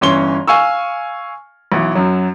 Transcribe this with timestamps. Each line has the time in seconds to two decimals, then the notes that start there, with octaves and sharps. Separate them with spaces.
0.01 G1 E3 C#4 C#5 C6 G7
0.48 F5 G#5 C#6 E6
1.72 B1 E3
1.95 F#2 F#3